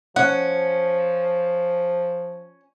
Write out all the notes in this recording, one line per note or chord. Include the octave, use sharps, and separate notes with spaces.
F3 C#4 F#5